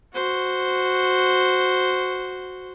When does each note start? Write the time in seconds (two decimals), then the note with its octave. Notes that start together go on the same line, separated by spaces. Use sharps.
0.14 F#4 C5